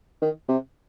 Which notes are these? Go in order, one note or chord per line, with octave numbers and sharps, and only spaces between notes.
D#3
C3